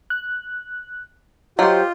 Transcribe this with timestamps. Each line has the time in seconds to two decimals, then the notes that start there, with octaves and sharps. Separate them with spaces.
0.10 F#6
1.59 F#3 F4 G4 C5 D#5 G6